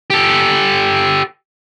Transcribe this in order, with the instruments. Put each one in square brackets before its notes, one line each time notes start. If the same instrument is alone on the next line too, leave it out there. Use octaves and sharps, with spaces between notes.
[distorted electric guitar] G4 A4